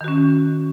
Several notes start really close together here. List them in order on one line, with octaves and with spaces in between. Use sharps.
D#3 F#4 C#4